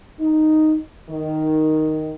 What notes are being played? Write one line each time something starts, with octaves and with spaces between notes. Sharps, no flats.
D#4
D#3